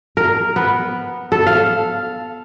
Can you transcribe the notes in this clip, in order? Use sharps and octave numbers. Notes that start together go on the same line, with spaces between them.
A#4
B3
A4
F5